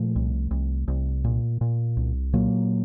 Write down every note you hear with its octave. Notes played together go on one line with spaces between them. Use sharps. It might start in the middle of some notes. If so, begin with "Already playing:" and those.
Already playing: A#2 F3 A3
C2
C2
C2
A#2
A#2
C2
A#2 F#3 A#3